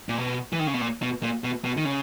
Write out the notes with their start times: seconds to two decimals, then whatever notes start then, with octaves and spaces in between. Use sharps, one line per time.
0.09 A#2
0.18 B2
0.53 E3
0.59 D#3
0.67 C#3
0.74 B2
0.81 A#2
1.02 B2
1.23 A#2
1.44 B2
1.65 B2
1.77 D#3
1.85 C#3